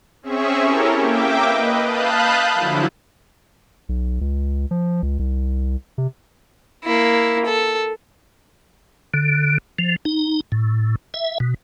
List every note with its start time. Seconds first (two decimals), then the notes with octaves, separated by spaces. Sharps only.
0.22 C4 C#4 G#4 E5 C#6
0.61 C#4 E4 G4 A4 A#4 C#5
0.99 A#3 E5 G5 D6
1.45 B4 D#5
1.80 F5 A5 B5 D#6 F#6 G6
2.54 D3 F3 F#3 E4
3.89 B1
4.21 C#2
4.71 F3
5.02 C#2
5.19 C2
5.98 C3
6.85 A#3 E4
7.46 A4
9.14 D3
9.79 F3
10.05 D#4
10.52 A2
11.14 E5
11.40 B2